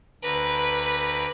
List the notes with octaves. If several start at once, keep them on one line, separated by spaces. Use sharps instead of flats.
D2 B4 A#5 D6